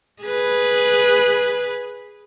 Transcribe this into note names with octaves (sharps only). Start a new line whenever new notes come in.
G#4 B4